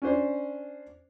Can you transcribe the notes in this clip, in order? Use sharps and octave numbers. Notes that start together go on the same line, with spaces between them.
C#4 D4 C5